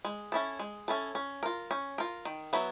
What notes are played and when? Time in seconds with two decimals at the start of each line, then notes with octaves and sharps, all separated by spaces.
0.05 G#3
0.32 C#4 E4 A4
0.60 G#3
0.88 C#4 E4 A4
1.15 C#4
1.43 F4 A#4
1.71 C#4
1.98 F4 A#4
2.25 D#3
2.53 F#3 B3 E4